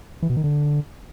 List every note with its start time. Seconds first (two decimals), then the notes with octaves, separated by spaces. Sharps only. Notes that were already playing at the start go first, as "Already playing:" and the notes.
0.22 E3
0.30 B2
0.37 D#3
0.44 D3